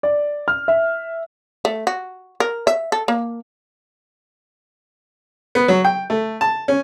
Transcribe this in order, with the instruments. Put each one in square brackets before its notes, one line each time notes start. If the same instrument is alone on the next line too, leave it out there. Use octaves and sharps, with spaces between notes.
[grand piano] D5
F6
E5
[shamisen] A3
F#4
A#4
E5
A4
A#3
[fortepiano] B3
F#3
G5
A3
A5
C#4